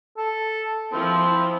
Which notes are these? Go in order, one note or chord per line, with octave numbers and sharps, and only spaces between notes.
A4
F3 C4 E4